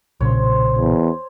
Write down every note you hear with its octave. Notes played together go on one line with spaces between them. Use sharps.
B1 A#2 C#3 C5 C#5
E2